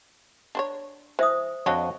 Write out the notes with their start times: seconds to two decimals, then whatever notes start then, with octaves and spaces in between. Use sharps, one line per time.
0.55 D4 C5 C#5
1.19 E3 C5 E5 D#6
1.66 F2 C4 D4 F#4 C#5 D#5 C#6